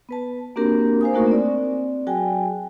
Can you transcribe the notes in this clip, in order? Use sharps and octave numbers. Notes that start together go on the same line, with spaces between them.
B3 B4 A5
A#3 C4 D4 F#4 G4 A#4
C5 F5 G#5 D#6
A3 A#3 D#4 F#4 A#4 C#6
C4 D5
F#3 F#4 G#4 G5 G#5